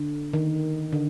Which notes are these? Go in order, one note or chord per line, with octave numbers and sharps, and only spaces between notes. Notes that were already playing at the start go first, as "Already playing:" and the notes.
Already playing: D3
D#3
D3